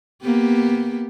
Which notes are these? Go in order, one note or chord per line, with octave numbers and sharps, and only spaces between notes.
A#3 B3 G4